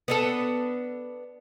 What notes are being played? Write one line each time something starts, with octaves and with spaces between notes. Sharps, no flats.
B3 D4 A4